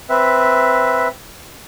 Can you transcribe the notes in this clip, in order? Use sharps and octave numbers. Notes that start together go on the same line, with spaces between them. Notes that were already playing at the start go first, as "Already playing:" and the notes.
C4 B4 E5